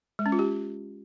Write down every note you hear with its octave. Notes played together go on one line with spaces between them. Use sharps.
G#3
C#4
F4
G4